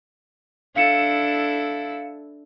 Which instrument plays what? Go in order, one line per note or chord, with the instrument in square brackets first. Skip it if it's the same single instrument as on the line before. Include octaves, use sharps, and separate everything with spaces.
[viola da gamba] D4 E4 A4 [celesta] F5 C#7 E7